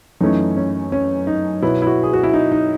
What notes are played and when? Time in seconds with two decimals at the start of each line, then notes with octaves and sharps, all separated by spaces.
0.20 F#2 E3 A3 C#4 D#4
0.57 C#4
0.92 C#4
1.27 D#4
1.62 B2 F#3 B3 E4
1.82 E4
1.87 F#4
2.03 G#4
2.13 F#4
2.23 E4
2.33 D#4
2.52 D#4